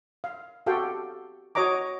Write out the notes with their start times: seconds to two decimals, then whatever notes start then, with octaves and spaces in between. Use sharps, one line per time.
0.24 F5
0.66 F#4 G4 A4 F5 G5
1.55 F#4 C#5 D#5 A#5 D6